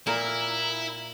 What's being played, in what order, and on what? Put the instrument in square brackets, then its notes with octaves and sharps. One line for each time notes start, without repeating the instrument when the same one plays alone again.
[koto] A#2 A#4 [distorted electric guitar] E4